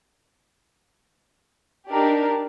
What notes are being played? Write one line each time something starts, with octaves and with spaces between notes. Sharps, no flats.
D4 D#4 G4 A#4 D5